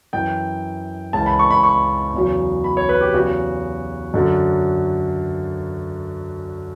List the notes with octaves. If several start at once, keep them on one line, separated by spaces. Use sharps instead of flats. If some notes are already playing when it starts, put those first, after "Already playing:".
F#2 E3 G5
C#2 C#3 E3 A5
B5
C#6
B5
C#6
E2 C#3 F#3
B5
C#5
B4
G4
E2 C#3 F#3 F#4
F#2 D3 F#3